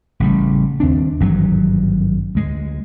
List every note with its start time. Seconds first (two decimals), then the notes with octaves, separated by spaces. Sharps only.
0.20 A1 C#3 G3
0.80 D#2 C4 D4
1.21 G#1 G2 E3 F#3
2.35 D2 G#3